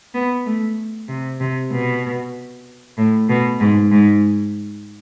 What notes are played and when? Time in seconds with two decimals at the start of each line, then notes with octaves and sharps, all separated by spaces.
0.14 B3
0.46 A3
1.09 C3
1.40 C3
1.71 B2
2.98 A2
3.29 B2
3.60 G#2
3.91 G#2